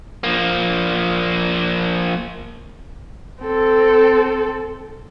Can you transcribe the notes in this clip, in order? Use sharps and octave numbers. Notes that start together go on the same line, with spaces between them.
F3 A#3
C4 A4